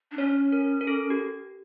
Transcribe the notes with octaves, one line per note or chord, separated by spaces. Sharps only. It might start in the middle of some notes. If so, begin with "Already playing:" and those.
D4
C#4 C#5
A#4
A#4
A4
G4